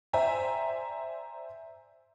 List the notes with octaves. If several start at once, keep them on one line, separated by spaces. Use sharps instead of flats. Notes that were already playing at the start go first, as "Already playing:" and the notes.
C5 D5 E5 G5 G#5 A#5